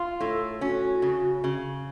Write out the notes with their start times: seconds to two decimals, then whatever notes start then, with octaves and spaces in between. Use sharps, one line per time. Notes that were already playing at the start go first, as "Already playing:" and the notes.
Already playing: F4
0.21 A2 A4
0.61 C#4 F#4
1.02 C#3
1.44 C#3